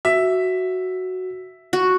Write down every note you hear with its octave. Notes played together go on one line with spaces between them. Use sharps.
F#4 E5
F#4